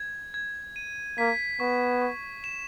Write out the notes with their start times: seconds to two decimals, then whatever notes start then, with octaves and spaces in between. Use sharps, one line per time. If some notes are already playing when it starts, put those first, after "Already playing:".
Already playing: G#6
0.34 G#6
0.76 D#7
1.18 A#3 B6
1.60 B3 C#6
2.02 C#6
2.44 E7